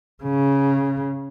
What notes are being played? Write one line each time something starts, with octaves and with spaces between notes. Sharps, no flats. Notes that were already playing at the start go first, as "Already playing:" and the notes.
C#3